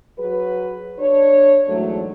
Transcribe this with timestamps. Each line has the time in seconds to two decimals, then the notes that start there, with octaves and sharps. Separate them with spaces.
0.19 F#3 G#4 B4
0.99 D4 C#5
1.69 E2 G#2 F#3 A3